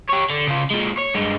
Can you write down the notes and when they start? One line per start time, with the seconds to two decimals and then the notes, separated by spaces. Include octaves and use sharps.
0.09 G4 C#5
0.30 D3
0.48 C#3 F4
0.71 A#2 G#3
0.98 C#5
1.15 G2 G#3